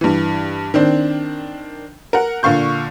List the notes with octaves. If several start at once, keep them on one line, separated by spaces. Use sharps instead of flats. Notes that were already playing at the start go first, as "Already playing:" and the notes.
G2 E3
D#3 C4 D4
A#4 F#5
A#2 D3 F5 C#6 G6